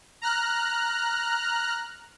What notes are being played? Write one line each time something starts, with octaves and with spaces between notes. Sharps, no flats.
A#5 F6 F#6